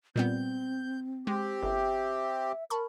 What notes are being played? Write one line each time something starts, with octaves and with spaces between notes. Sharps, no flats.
A#2 G3 B3 C4 G6
G#3 C4 G4
G1 E5
A#4 A5 B5 C#6